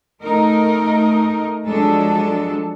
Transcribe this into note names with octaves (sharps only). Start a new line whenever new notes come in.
A3 D#4 A#4
F3 F#3 G#3 D4 A4